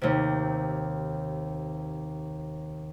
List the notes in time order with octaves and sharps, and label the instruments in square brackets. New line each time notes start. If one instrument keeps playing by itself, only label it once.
[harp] D#2 C3